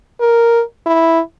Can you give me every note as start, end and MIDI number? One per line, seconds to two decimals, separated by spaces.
0.21 0.62 70
0.86 1.20 64